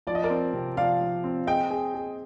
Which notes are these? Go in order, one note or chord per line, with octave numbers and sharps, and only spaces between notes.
F3 D5
D#5
A#4 D5
C4
C3
F3 D5 F5
F3
C4
G#4 D#5 G5
G#4
G#4